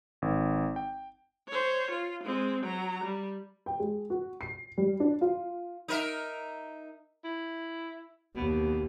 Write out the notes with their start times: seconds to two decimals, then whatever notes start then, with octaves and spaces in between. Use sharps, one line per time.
0.22 G#1
0.76 G5
1.48 C5 C#5
1.91 F4
2.24 G#3 C4
2.63 F#3 A#5
3.04 G3
3.66 G5
3.80 G#3
4.10 F#4
4.41 C7
4.78 G3
5.00 D4
5.21 F4
5.88 D#4 A#4 E5
7.25 E4
8.36 D#2 B2